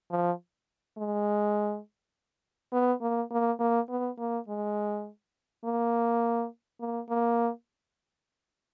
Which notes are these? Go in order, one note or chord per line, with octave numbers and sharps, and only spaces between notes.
F3
G#3
B3
A#3
A#3
A#3
B3
A#3
G#3
A#3
A#3
A#3